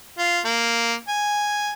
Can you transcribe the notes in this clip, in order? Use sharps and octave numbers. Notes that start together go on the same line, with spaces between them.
F4
A#3
G#5